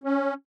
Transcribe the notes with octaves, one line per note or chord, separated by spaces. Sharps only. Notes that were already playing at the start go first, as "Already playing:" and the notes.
C#4